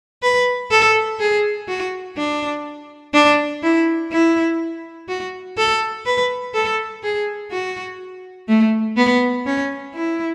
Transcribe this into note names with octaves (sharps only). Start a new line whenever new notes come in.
B4
A4
G#4
F#4
D4
D4
E4
E4
F#4
A4
B4
A4
G#4
F#4
A3
B3
C#4
E4